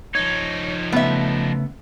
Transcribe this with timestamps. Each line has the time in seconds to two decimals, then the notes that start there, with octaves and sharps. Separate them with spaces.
0.15 F3 D#4 C#5
0.92 C#3 A3 B3 E5